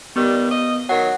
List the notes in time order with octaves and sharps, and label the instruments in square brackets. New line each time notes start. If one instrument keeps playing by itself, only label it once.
[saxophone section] D#3 G3 [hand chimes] B3
[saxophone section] D#5
[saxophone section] D#3 F#3 [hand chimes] F#5